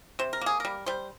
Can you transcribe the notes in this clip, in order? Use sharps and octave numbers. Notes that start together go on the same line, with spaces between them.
C3 C5
A#4
A#3 G#4
G3 A#4
G3 C5